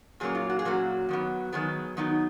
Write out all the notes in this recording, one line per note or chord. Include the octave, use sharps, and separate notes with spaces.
A#2 F#3 A#3 C#4 G#4
F4
F#4
G#4
A#2 F#3 A#3 C#4 F#4
D#3 F#3 B3
D#3 F#3 B3 G#4
D#3 F#3 B3 D#4